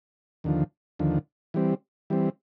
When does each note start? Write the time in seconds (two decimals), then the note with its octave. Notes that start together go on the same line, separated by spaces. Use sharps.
0.44 D#2 D3 F3
0.99 D#2 D3 F3
1.54 E3 G3 C4
2.10 E3 G3 C4